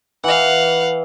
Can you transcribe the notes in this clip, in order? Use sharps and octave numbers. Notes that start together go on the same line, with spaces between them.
E3 F5 F#5